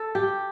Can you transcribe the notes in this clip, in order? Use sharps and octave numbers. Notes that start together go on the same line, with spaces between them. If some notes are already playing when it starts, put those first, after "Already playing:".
Already playing: A4
G4